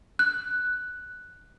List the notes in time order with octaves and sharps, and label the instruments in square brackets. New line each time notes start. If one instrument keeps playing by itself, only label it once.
[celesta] F#6